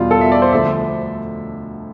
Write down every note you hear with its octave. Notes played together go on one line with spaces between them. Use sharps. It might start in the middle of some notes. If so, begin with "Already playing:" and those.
Already playing: E2 B2 G3 F4
A4
E5
D5
C5
D2 D3 F3 E5